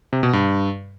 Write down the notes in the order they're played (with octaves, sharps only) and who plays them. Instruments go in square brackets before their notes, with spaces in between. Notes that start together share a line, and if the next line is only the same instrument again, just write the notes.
[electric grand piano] C3
B2
G2